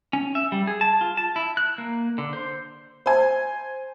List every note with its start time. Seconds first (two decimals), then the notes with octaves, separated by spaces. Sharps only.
0.13 C#4
0.35 E5
0.52 G3
0.67 G#4
0.81 A5
1.01 F4
1.17 A5
1.36 E4
1.57 F#6
1.78 A#3
2.18 D3
2.33 C5
3.06 C5 G#5